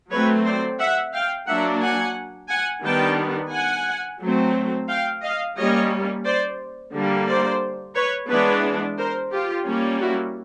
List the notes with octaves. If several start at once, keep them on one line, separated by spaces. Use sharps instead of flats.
F#3 A3 C4 B4 C#5
C5 D5
E5 F#5
F5 G5
F#3 A#3 D4 E5 F#5
F#5 G#5
F#5 G#5
D#3 G3 B3 D4 G5 A5
F#5 G#5
F#3 A3 C4
F5 G5
D#5 F5
G3 A#3 C#4 C#5 D#5
C5 D5
D3 G3 A#3
C5 D5
B4 C#5
E3 G#3 B3 D4 B4 C#5
A#4 C5
F4 G4
G3 A#3 C#4
E4 F#4